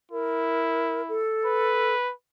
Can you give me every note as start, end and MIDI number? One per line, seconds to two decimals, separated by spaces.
0.12 1.23 64
0.12 1.02 70
1.09 1.94 69
1.46 2.13 71